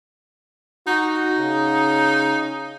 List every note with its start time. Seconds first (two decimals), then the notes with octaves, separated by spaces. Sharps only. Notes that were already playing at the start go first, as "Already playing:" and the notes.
0.87 D#4 F#4
1.37 C#3